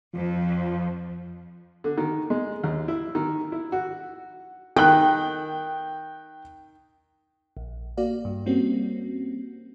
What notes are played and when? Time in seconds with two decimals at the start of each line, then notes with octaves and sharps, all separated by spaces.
0.13 F2 F3
1.84 D3
1.98 D#3
2.30 G#3
2.64 D#2
2.88 E4
3.15 D#3
3.52 E4
3.72 F#4
4.76 D#3 G5 F#6
7.57 A#1
7.97 A#3 F#4 D5 F5
8.25 G2
8.46 G3 A#3 C4 C#4 F#4